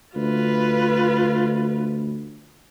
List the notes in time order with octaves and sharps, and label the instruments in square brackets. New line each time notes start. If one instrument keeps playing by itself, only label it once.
[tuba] D2 [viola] F4 B4